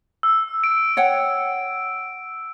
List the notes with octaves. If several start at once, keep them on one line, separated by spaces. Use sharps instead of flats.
E6
D7
C#5 F#5 G5